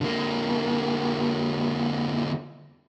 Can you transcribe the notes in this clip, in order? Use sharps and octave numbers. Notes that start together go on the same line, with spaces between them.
D3 A#3